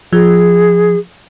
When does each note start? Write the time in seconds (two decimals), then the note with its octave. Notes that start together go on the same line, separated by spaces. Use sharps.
0.13 F3 G#4